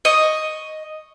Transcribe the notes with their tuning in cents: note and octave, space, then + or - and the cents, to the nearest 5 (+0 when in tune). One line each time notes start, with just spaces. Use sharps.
D#5 +0 C#6 +0